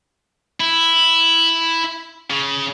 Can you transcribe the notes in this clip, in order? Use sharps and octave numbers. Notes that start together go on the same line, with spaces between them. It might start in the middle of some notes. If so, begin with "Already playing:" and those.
E4
C#3